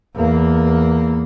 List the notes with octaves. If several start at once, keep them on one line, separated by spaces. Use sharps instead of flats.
E2 A#3